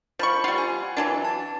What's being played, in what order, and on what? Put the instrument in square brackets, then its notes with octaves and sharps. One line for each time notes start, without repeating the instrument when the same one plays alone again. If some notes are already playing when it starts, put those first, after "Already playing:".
[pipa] F3 C#6 [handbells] C5 B5
[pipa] G3 F4 [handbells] F#5
[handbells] G#5
[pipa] E3 F#3 D4
[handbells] A5